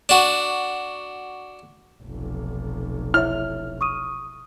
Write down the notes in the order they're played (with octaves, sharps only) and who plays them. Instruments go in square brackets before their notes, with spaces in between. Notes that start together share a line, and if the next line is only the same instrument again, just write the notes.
[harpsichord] D4 F#4
[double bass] F1 B1
[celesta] E4 C#5 E5 [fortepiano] F6
[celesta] C#6 D#6 D#7